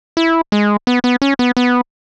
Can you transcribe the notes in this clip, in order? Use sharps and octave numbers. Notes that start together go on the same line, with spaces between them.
E4
G#3
B3
B3
C#4
B3
B3